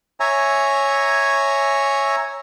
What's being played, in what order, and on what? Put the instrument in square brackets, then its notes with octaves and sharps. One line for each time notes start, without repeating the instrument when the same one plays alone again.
[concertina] C#5 E5 G#5 A#5